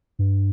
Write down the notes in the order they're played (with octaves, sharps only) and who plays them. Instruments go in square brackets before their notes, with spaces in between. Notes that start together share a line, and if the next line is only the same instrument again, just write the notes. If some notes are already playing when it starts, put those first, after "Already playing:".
[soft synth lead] G2